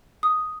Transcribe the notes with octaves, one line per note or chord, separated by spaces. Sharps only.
D#6